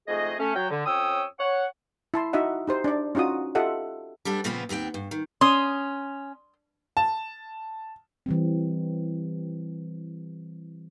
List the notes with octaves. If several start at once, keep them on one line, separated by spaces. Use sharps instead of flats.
F2 G#2 A3 G#4 D#5
A3 C#4
F#3 G5
D3
F2 C#4 C#5 G5 D#6 E6
C#5 F#5
E4 A5 C6
D#4 F#4 D#5 E5 F#5
D#4 G4 C5
D4 D5
C#4 D#4 F4 F#4 D#6
F4 G4 A4 D#5 E5 F#5
G3 B3 D4 A4
A#2 C#3 F3 B3 C4 F4
D#2 B3 C4 G5
G2
D#3
C#4 C6 D#6
A5
E3 G3 C4